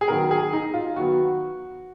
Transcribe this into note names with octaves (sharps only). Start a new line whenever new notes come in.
G#4
D#3 F#3 B3 A#4
G#4
D#4
F4
D#3 F#3 B3 F#4